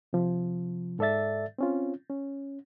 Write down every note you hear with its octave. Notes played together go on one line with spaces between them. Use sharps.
C3 F3
G#2 A4 D5 E5 A6
C4 C#4 F4
C#4